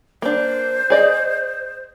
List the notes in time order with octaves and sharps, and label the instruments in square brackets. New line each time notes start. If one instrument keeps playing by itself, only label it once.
[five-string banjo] A#3 D4 [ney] C5
[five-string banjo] G#4 D5 D#5